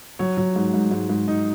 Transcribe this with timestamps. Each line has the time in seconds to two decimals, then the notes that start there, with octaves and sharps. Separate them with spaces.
0.19 F#3 C#5
0.37 F#3
0.56 G#2
0.74 G#2
0.91 G#2
1.10 G#2
1.28 D#4